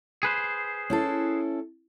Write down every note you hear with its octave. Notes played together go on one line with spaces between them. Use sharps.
G#4 B4 C5
C#4 E4 A4